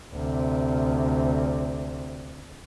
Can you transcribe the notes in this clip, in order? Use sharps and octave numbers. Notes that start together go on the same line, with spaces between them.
D2 C3